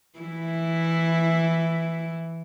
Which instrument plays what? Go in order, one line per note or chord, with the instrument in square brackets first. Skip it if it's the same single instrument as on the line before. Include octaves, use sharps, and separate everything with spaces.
[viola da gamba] E3 E4